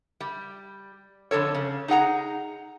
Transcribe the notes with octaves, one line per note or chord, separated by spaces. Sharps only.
G3
F2 D3 A4 C#5
C#3
D#4 G#4 F#5 A#5